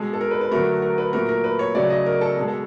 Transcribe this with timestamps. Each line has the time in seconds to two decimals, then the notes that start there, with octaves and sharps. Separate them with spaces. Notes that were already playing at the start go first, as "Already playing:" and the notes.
Already playing: B2 G#3 A4
0.13 A4
0.21 A#4
0.31 B4
0.41 B4
0.51 D3 F#3 A3 A#4
0.82 A#4
0.98 B4
1.13 A#2 F#3 A3 A#4
1.29 A#4
1.44 B4
1.59 C#5
1.75 C#3 F#3 A3 D5
1.90 D#5
2.06 A#4
2.21 A4
2.36 B2 G#3
2.48 A4